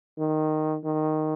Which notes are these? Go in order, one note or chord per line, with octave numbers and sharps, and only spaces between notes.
D#3
D#3